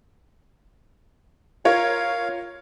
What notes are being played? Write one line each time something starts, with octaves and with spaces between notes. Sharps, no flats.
F4 A#4 C#5 F5